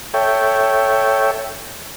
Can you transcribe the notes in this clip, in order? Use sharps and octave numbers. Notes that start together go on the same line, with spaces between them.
A4 C#5 E5 G5